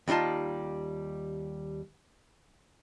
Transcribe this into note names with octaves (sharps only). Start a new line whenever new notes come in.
D#2 G3 D#4 F4 A5